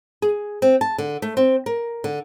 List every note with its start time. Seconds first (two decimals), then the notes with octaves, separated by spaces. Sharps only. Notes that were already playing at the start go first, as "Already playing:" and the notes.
0.22 G#4
0.62 C4
0.81 A5
0.98 D3
1.22 A3
1.37 C4
1.66 A#4
2.04 D3